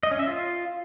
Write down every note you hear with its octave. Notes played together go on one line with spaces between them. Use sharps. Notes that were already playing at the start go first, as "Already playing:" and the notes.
D#5
C#4
E5
F4